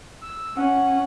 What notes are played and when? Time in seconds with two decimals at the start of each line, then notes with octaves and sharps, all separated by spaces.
0.21 E6
0.57 C#4 F#5